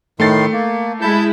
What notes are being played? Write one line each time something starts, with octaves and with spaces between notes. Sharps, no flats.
A2 D#3 A3 C6 A6 C7
A#3
G#3 E4 A5 G6